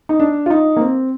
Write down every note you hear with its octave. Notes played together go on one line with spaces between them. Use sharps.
D#4
D4
F4
D#4
A#3
C4